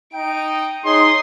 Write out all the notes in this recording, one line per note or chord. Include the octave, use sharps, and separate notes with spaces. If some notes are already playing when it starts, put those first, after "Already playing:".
D#4 G5 D7
D#4 G#4 C#5 C6 D#6